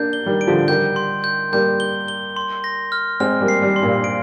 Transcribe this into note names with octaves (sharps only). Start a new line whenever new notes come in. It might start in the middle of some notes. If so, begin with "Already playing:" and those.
Already playing: A#3 D4 G6
G7
D#3 G3
D7
D3 F3
D#3 G3 G6
C6
G6
G3 A#3 G6
G7
G7
C6
A#6
F6
G#3 C4 F6
G3 A#3
C7
D#3 G3
C6
G2 A#2
D7